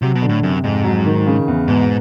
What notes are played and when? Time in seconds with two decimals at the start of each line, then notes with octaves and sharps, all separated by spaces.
0.02 C3 F#3
0.15 B2
0.22 D3
0.29 A2
0.43 F#2 C3
0.64 F2 G#2
0.84 F#3
1.06 D#3
1.27 C#3
1.48 E2
1.67 G#2 B2